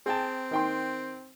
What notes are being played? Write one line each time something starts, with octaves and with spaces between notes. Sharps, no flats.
C4 G#4 G5 A5
D#3 G5 C6